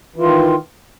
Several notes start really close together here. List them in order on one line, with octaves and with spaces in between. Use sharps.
E3 F4 D#3